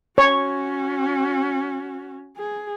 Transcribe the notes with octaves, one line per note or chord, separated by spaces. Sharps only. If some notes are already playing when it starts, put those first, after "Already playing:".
C#4 F#4 C#5
G#4